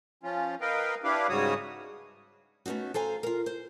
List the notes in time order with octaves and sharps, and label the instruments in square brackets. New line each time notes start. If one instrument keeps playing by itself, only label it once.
[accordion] F3 C#4 F4
A#4 B4 D#5 F5 G5
D4 E4 G4 B4 F5
G#2 C#3 G3 F#4 C#5 D#6
[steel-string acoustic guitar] A3 B3 C#4 D#4 F#4
A4 C5 F5 G#5 A#5
F4 A#4
C5